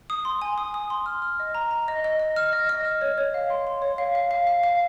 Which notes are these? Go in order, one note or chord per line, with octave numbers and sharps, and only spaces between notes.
D#6
C6
G#5
D#6
D#6
C6
F6
F6
D#5
A#5
A#5
D#5
D#5
D#5
F6
D#5
D#5
F6
C#5
C#5
F5
C6
C6
C#5
F5
F5
F5
F5
F5